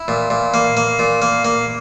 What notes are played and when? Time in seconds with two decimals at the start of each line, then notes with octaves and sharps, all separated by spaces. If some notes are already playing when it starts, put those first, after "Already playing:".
Already playing: E4
0.08 A#2
0.30 A#2
0.54 A#3
0.77 A#3
0.99 A#2
1.22 A#3
1.45 A#3